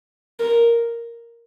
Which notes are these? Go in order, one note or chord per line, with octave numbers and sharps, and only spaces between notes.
A#4